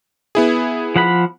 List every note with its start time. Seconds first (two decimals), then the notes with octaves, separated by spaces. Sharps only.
0.35 B3 E4 G#4
0.96 F3 F#5 B5